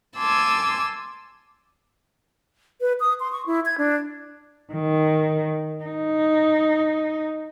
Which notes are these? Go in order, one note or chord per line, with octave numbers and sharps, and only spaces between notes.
G#5 A5 C6 D6 E6 G#6
B4
D#6
C6
C#6
E4
G#6
D4
D#3
D#4